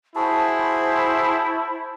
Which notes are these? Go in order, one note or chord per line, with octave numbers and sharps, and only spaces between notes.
E4 F#4 G#4 C5 A5